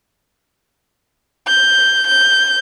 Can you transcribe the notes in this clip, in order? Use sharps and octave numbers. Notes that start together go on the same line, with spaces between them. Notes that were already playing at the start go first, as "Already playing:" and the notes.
G6
G6